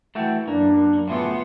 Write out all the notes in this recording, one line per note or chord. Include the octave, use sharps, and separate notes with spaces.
E3 A3 F#4 G5
F#2 A#3 D4
D2 A2 C#3 E3 A3 B3 F4